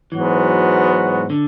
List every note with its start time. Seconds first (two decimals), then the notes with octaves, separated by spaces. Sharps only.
0.12 G#2 E3 F#3 B3 F#4
1.30 D3